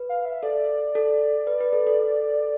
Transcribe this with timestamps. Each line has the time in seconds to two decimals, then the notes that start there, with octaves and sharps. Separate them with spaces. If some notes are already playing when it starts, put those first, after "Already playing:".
Already playing: B4
0.09 F5
0.25 E5
0.43 A4 D5
0.95 A4
1.47 B4
1.61 B4
1.73 A4
1.87 A4